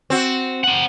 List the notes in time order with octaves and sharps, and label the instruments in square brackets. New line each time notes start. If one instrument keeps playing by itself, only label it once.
[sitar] C4 F#4
[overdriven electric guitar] C4 F#5